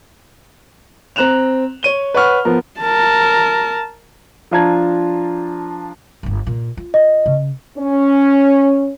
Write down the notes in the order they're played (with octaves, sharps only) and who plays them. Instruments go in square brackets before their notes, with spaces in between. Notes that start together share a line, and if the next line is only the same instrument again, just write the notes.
[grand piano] C4 A#5 F#6 E7 F7
C#5 D#7 G7
B4 C#5 F#5 C#6 F6
F3 B3 A#4
[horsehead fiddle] A#4 A5
[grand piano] F3 D4 F4 A5 A#5 G#6
[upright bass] D1 G1
A#2
F4
[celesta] D#5
[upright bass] C#3
[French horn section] C#4